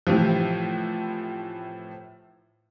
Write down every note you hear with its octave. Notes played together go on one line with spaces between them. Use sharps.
A2 C3 E3 F3